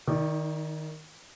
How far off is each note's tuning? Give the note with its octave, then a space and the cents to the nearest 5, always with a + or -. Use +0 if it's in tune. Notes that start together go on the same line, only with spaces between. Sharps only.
D#3 +0 D#4 +45 D5 +0